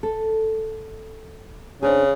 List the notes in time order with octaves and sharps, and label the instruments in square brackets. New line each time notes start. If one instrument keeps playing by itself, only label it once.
[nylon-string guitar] A4
[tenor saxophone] C#3 [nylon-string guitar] C4 D4 G#4